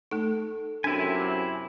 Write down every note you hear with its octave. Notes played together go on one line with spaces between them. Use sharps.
A3 D#4 A4
F#2 C3 D4 E4 G#5